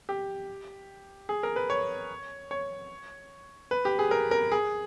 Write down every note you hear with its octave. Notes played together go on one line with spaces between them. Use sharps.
G4
G#4
A#4
B4
C#5
C#5
B4
G4
G#4
A#4
A#4
G#4